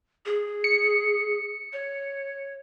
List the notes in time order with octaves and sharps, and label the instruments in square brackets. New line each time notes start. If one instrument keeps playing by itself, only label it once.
[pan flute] G#4
[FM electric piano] C#7
[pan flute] C#5